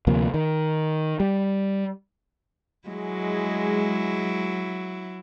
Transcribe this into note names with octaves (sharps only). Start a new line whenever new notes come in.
D2 C3 F3 A#3
D#3
G3
F#3 G#3 E4